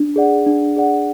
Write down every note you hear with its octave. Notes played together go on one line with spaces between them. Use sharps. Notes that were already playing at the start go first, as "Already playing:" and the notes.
Already playing: D4
G#4 D5 F#5
D4
G#4 D5 F#5